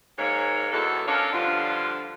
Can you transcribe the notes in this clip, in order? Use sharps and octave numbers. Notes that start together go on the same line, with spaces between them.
G#2 A#3 C#5
E2 B2 A4
C#4 D4 A4 A#4 C#5 F5
G2 D3 F3 D4 F4